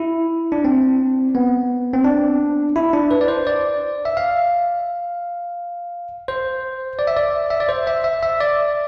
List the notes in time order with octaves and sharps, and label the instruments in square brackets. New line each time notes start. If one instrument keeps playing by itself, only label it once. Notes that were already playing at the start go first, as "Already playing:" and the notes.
Already playing: [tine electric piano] E4
D4
C4
B3
C4
D4
E4
D4
B4
D5
C5
D5
E5
F5
C5
D5
E5
D5
E5
D5
C5
E5
E5
E5
D5